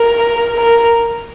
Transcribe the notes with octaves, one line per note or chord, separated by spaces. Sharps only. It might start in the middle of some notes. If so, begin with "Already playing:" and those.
Already playing: A#4
A#4